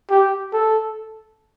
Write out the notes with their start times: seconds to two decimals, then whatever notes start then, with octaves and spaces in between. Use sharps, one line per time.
0.11 G4
0.53 A4